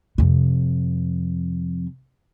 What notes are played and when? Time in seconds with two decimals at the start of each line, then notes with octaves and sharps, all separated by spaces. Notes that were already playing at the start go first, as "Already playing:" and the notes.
0.18 F2 C3